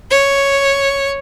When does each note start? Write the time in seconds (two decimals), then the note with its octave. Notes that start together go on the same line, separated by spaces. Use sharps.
0.11 C#5